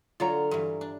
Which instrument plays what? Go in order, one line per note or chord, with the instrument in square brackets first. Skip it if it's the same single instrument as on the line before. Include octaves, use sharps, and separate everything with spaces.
[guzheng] D3 F#3 [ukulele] F4 C#5 A#5
[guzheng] G2 E3
D4